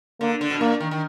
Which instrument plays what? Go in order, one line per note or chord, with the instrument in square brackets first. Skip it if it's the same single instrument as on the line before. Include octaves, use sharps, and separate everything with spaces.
[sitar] D3 [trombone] A#3
[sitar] D3
B2
[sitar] A#2 [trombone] A#3
[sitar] D#3
D#3